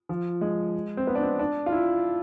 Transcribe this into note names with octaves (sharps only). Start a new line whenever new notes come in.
F3
G#3
C4
B3
D4
C4
D4
F4
E4